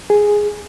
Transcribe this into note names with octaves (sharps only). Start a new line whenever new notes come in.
G#4